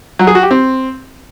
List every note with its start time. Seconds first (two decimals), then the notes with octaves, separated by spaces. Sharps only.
0.19 F#3
0.27 G#4
0.35 F#4
0.43 G4
0.51 C4